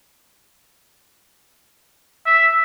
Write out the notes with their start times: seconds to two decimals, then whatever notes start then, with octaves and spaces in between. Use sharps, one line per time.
2.26 E5